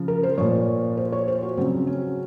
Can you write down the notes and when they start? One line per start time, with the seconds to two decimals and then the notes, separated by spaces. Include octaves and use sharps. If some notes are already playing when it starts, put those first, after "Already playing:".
Already playing: C#3 F3
0.08 A#4
0.23 C5
0.38 A#2 F3 C#5
0.97 C5
1.12 C#5
1.28 C5
1.43 F#4
1.57 C#3 F#3 C4
1.87 C#4